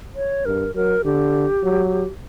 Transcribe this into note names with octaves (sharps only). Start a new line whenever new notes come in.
C#5
G2 A#4
F#3 A#4
D3 G4
F#3